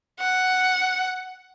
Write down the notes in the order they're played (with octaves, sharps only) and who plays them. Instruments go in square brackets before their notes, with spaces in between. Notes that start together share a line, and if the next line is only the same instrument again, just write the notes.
[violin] F#5